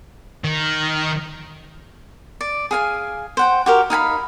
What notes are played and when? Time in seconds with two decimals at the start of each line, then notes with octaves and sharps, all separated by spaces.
0.44 D#3
2.41 D5
2.71 G#4 F5 G#5
3.37 C5 F#5 G5
3.66 F#4 G4 A#4
3.90 D#4 F5 G#5 B5